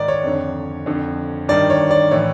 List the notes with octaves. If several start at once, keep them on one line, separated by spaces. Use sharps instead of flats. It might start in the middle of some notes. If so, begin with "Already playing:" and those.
Already playing: G#2 D#3 D5
C#5
F2 D3
F2 D3
G2 D#3 D5
C#5
D5
A2 E3 C#5